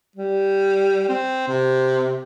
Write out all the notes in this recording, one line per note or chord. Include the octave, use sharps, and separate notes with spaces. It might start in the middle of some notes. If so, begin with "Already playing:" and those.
G3
C4
C3